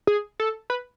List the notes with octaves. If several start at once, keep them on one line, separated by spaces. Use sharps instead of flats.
G#4
A4
B4